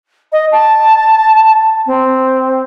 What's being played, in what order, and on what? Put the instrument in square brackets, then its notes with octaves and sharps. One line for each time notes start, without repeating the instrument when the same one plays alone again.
[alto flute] D#5
A5
C4